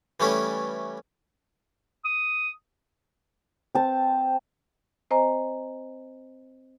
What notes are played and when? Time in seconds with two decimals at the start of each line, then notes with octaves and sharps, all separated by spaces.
0.20 E3 G3 A3 C#4 E4
2.05 D#6
3.75 C4 A5
5.11 C4 C5 D#5 G#5 A#5